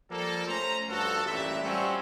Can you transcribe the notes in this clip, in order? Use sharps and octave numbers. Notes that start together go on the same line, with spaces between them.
F3 G3 A#3 A4
A3 C#4 C5 A#5
G2 F3 F#4 A4
A1 G2 A#2 E5
G3 C4 C#4 F4 F#4 A4